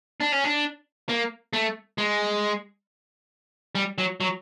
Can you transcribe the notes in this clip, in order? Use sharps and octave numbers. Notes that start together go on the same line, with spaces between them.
D4
C#4
D4
A#3
A3
G#3
G3
F#3
F#3